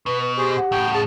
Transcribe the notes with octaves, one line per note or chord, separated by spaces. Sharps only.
B2 B4
B4
G4 G#4 C5 C#6
F#5
A2 C#3 G5
G#4 A5